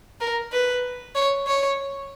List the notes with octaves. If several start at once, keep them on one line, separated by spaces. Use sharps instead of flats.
A#4
B4
C#5
C#5